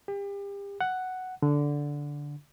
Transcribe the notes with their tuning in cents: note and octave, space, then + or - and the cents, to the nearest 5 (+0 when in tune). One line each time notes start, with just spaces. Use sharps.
G4 +35
F#5 +5
D3 -10